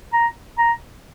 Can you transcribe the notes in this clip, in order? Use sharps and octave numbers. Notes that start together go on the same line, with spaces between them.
A#5
A#5